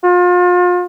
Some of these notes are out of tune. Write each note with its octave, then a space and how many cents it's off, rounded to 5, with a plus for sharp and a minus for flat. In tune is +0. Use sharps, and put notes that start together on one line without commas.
F4 +35